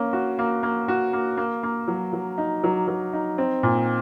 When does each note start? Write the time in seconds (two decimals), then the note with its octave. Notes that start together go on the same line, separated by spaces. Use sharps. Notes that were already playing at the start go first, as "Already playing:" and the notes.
Already playing: A#3 C#4
0.13 F#4
0.39 A#3
0.63 A#3
0.88 F#4
1.13 A#3
1.37 A#3
1.63 A#3
1.88 F#3
2.13 F#3
2.38 D#4
2.64 F#3
2.88 F#3
3.13 D#4
3.38 C4
3.63 A#2